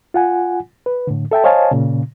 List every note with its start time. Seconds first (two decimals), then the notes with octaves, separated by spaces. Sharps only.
0.14 F4 F#5 G#5
0.86 B4
1.07 A2 D3
1.31 A4 E5 G5 A5
1.44 C5 C#5 D#5 F5 G#5 A5
1.71 A#2 C#3